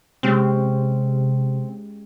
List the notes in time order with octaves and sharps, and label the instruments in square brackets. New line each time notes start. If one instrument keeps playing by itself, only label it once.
[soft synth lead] C3 [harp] G#3 C#4 G4 [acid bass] C4